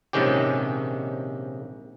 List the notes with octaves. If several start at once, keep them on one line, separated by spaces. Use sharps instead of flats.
A#1 G#2 C3 D#3 C#4 G4